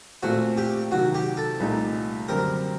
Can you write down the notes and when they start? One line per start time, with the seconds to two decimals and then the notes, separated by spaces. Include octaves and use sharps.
0.23 A#2 A3 C4 F#4
0.57 G4
0.92 C3 D#3 F#3 F#4
1.14 G4
1.37 A4
1.60 C2 A#2 A3 D#4 G4
2.28 F#2 D3 G3 C4 G4 A#4